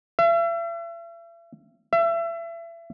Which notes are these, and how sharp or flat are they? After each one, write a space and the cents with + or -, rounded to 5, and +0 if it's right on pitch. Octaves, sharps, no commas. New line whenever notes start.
E5 +40
E5 +30